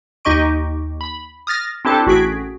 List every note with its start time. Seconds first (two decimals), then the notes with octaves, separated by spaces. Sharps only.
0.25 D#2 D#4 G4 D#5 C#6 D7
1.01 B5
1.47 D#6 F6 A6 A#6
1.85 C4 D4 E4 G4 A4 A5
2.06 A1 F#4 G#4 B6 D7